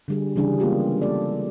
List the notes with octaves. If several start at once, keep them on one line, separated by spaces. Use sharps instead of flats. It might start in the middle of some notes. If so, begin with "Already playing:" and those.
D3 G3 G#4
C#3 E3 G3 D4 G#4
G#3 A#3 B3 C#4 F4 G4
A#3 A4 D5